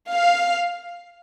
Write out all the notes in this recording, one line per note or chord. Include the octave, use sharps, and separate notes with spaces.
F5